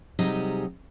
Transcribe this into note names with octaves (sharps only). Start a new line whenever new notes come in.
C3 F#3 G3 D#4 G#4 D#5